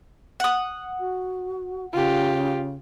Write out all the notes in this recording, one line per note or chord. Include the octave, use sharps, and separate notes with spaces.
F#5 D#6
F#4
C#3 F4 G4